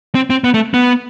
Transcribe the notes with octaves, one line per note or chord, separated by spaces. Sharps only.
C4
C4
B3
A3
B3